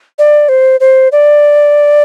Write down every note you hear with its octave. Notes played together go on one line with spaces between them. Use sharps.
D5
C5
C5
D5